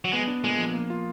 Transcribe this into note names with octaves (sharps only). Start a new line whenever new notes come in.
F#3
G#3 B3
D4
A#2 G#3
F3
A#3
F4